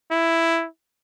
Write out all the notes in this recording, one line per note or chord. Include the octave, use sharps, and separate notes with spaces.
E4